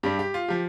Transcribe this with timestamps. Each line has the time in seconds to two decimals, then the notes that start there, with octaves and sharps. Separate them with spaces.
0.03 G2 G3 G4
0.19 G4
0.34 F4
0.49 F3 G4